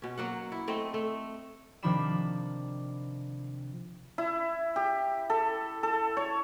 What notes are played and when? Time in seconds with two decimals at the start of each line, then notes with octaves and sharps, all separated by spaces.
0.02 B2 C#4
0.18 F#3 A#3 F#5
0.52 E4
0.68 A3 C4 D#5
0.94 A3
1.83 C3 D#3 F3 D4 B5 E7
4.18 E4
4.76 G4
5.30 A4
5.83 A4
6.17 C#5